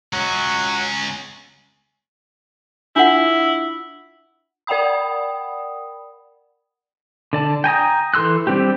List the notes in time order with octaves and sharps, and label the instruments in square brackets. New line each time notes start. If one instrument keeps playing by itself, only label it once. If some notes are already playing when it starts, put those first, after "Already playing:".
[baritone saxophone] F#3 [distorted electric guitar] G#3 C#4
[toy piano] D4 F4 F#5 [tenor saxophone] E4
[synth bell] A#4 D5 F#5 G5 B5 D#6
[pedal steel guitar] D3 D5 A5
G5 G#5 A#5 D#6
E3 A4 C6 E6 F#6
G3 C4 D4 G4